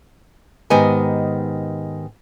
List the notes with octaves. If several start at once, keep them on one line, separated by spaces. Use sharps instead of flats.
G#2 D#3 B3 G4 D#5 G#5